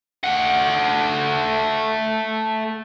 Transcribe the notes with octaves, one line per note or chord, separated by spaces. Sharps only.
A3 F#5